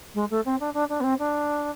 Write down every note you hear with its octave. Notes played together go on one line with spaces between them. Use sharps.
G#3
A3
C4
D4
D4
D4
B3
C4
D4